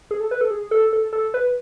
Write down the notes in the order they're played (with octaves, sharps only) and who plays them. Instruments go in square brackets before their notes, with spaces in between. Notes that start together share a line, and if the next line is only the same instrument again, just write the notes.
[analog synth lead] G#4
A4
B4
A4
G#4
A4
A4
A4
B4